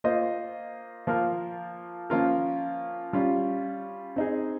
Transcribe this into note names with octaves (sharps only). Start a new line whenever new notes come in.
A#3 F4 C5 D#5
F3 A#3 F4 A#4
F3 A#3 C#4 F4 A#4
G3 C#4 F4
C4 D#4 G#4